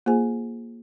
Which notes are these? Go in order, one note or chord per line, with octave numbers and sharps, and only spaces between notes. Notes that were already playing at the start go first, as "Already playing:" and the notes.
A#3 F4 G#4 C5 G#5